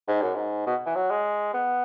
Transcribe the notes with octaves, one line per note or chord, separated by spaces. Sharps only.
G#2
F#2
G#2
B2
E3
F#3
G#3
B3